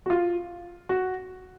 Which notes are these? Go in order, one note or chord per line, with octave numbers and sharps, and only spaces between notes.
F#4
F4
F#4